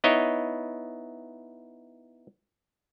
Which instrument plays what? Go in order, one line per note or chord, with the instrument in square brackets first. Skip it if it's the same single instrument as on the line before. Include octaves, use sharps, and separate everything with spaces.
[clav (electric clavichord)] B3 D#4 E4 C#5 D#5